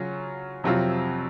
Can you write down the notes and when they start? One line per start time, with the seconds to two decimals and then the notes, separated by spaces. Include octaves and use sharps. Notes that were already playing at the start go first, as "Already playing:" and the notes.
Already playing: C#3 F#3 C#4 F4
0.64 F2 C3 F#3 C4 F4